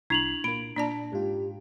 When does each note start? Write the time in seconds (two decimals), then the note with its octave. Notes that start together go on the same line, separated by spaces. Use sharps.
0.10 C2 D4 E4 G#6 F7 F#7
0.44 A#2 A#3 B5 D7
0.76 A#2 D4 D5 A5
1.13 G#2 F4 G4